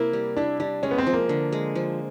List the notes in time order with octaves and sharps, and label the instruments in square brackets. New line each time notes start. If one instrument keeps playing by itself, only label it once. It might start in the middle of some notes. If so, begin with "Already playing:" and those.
Already playing: [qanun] C3 E4 [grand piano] A#3
[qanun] G3
[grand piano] D4 [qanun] E4
[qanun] G3 [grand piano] D4
[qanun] G#3 [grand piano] C#4
[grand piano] B3
C4
[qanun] F3
[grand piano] A#3
[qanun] D3
G#3
F3